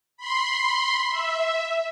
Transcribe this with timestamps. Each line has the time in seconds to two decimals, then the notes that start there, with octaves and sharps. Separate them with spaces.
0.17 B5 C6
1.09 E5